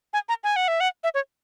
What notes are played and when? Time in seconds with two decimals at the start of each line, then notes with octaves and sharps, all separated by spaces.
0.13 G#5
0.29 A#5
0.44 G#5
0.56 F#5
0.68 E5
0.80 F#5
1.04 E5
1.14 C#5